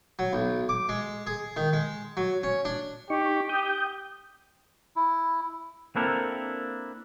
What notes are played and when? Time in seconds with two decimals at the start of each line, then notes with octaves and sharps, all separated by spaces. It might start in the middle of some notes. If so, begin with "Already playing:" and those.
0.19 F#3
0.33 B1
0.69 D6
0.89 G#3
1.27 G#4
1.56 D#3
1.73 G#3
2.17 F#3
2.43 C#4
2.65 D4
3.10 D#4 G4 C#6
3.49 G4 G5 D#6 G6
4.96 E4
5.96 A#3 C4 D4 E4 A4 A#4